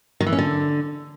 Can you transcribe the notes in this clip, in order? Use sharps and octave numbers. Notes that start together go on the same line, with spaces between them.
D#3
E3
C#4
D3